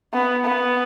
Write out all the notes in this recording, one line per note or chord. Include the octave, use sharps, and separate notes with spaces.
B3
B3